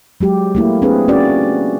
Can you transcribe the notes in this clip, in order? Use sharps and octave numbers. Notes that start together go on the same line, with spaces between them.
F#3 G#3 G4
A3 A#3 E4
C4 D4 G#4 B4
C#4 F#4 D5